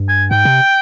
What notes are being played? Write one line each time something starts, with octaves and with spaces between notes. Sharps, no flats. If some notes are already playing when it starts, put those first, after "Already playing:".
Already playing: G2
G#5
G#2 G5
C3